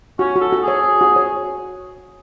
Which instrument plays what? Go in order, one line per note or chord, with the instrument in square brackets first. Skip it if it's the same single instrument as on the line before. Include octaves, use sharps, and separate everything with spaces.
[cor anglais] C#4 [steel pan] F#4
[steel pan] F#4
[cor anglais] A4
[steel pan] F#4
[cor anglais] G#4
[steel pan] C#5
C#5
F#4
C#5